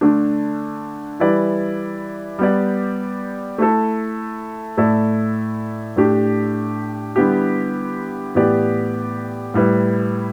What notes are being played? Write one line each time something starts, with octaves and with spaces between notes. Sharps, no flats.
D3 A3 D4
E3 G3 E4 B4 D5
G3 B3 G4 D5
A3 E4 A4
A2 A3 E4 A4 D5
A2 A3 D4 G4
D3 G3 B3 E4 G4
A2 E3 B3 G4 D5
A2 G3 E4 B4